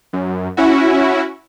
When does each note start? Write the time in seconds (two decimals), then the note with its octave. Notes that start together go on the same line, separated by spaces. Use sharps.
0.13 F#2
0.57 C#4 E4 F#4